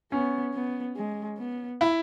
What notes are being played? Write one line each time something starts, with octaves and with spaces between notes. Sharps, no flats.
B3 C#4
B3
G#3
B3
E4